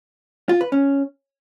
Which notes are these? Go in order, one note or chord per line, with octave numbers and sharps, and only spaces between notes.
F4
B4
C#4